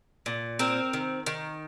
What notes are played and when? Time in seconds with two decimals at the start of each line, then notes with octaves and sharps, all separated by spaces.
0.26 A#2
0.59 C4 A#4
0.93 D#3
1.26 D#3